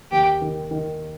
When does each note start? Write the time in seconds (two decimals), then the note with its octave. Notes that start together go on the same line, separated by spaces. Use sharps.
0.11 D#2 G4
0.41 D#3
0.71 D#3